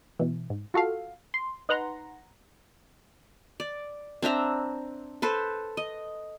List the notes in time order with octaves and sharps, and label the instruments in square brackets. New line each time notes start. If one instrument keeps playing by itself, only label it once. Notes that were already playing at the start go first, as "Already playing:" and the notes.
[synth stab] B2 E3
G#2
F4 F#4 A4 F5
C6
D#4 B4 F#5 A#5 C6
[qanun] D5
C4 D4 E5 A#5
A4 B4 C5
D#5